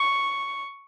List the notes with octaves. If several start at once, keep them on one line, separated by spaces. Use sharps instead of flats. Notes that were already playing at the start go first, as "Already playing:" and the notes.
Already playing: C#6